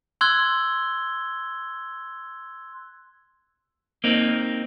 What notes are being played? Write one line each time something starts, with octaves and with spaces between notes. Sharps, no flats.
C6 E6 F#6 G#6 G7
A#3 C4 D#4